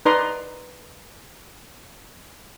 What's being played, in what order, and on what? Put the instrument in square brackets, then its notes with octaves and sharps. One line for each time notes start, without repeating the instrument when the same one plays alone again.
[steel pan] D#4 B4 D5 A#5 C6